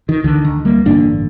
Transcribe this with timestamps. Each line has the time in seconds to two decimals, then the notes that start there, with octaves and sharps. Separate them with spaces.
0.09 D#3
0.24 D2 D3 D#3
0.45 D#3
0.65 G3 A#3
0.85 A1 G2 D3 A#3 D4